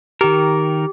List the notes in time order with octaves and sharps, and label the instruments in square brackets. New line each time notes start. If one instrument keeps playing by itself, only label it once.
[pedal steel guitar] D#3 A#4 [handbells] G4